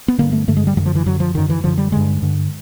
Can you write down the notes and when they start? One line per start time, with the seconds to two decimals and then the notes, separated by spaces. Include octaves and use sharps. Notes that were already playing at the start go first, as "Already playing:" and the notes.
0.08 B3
0.18 G2 D3 A#3
0.32 A3
0.48 G2 D3 A3
0.57 G#3
0.67 G3
0.77 F#2 F#3
0.80 D3
0.86 F3
0.95 E3
1.06 F#2 D3 F#3
1.20 F3
1.34 F#2 D3 D#3
1.50 E3
1.64 F#2 D3 F3
1.78 G3
1.92 G2 D3 G#3
2.22 G2 D3